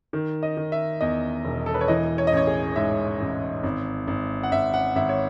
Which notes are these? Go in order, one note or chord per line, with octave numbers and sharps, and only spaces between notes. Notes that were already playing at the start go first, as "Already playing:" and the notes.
D#3
D#5
D#3
E5
E2 D#5
E1
A4
B4
C#5
E3 D#5
C#5
D#5
A1 C#5
G#4
G#2 E5
A1
G#1
G#1
F#5
G#1 E5
F#5
G#1 E5
C#5